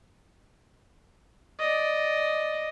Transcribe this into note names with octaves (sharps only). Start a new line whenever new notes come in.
D5 D#5